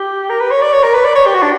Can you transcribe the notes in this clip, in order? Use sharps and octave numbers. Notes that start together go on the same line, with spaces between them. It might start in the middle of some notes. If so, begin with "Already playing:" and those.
Already playing: G4
A#4
B4
C#5
D5
C#5
A#4
B4
D5
C#5
G4
F#4
D4